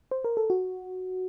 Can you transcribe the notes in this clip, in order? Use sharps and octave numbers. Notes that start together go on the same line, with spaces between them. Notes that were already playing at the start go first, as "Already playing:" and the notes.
C5
A#4
A4
F#4